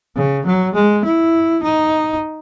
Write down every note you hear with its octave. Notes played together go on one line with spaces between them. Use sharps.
C#3
F#3
G#3
E4
D#4